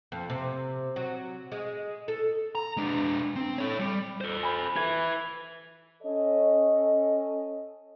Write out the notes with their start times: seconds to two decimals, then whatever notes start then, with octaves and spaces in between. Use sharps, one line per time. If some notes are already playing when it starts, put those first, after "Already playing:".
0.12 F2
0.30 C3
0.96 F#3
1.52 G#3
2.08 A4
2.55 A#5
2.77 G#3 D4
3.36 C4
3.58 A4 C#5
3.79 G3
4.21 A4 C5
4.43 G#5 B5
4.76 E4 B4 G#6
6.03 C#4 A4 C#5 D#5